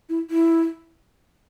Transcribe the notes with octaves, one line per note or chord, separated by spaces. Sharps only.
E4
E4